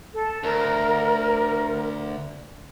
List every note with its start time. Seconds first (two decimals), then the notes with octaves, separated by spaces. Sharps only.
0.13 A4
0.44 D2 A#4